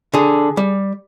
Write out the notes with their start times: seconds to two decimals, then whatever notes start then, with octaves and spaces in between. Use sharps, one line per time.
0.14 D3 G#4
0.57 G3